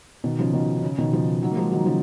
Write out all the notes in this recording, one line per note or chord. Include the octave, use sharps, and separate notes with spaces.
B2 D#3
C#3 F3
B2 D#3
D#3
C#3
B2 D#3
C#3 F3
D#3 F#3
A#3
F3 G#3
D#3 F#3
C#3 F3